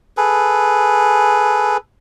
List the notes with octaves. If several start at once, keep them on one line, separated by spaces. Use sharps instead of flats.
G#4 A4 B4